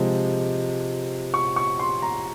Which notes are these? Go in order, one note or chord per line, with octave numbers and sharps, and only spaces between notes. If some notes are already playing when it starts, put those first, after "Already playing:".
Already playing: C3 F3 G#3
C#6
C#6
C6
A#5